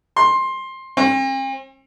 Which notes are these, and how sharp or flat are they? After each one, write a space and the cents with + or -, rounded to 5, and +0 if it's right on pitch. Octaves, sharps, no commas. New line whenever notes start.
C6 +15
C4 +45